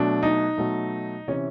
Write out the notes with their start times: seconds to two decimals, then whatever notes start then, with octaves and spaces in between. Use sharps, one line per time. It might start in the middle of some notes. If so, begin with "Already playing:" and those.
Already playing: B2 F#3 A3 D4
0.23 D#4
0.58 B2 F#3 A3
1.28 C3 E3 C#4